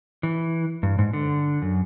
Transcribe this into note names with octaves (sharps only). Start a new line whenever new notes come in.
E3
G2
G#2
D3
F#2